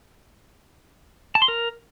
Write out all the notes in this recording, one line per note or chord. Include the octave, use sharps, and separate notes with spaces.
A5
C6
A#4